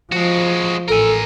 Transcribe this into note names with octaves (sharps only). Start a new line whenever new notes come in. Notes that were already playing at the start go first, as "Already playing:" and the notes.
F3 G#3 F#4
A1 A4 A#4 G#5